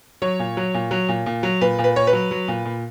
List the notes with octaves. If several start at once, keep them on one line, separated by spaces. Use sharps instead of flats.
F#3 C#5
A#2
F#3
A#2
F#3
A#2
A#2
F#3
A#2 B4
A#2
B4
A#2 C#5
B4
F#3
F#3
A#2
A#2